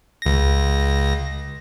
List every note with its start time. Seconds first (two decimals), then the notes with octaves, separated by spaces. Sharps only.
0.22 C#2 A#6